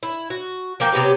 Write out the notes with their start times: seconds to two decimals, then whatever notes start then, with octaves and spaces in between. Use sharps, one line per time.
0.03 E4
0.30 F#4
0.80 F3 A#3 G5
0.92 C3 F#3 B3 G4